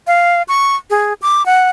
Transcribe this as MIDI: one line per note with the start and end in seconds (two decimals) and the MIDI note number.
0.07 0.42 77
0.48 0.76 85
0.90 1.13 68
1.22 1.45 86
1.46 1.70 78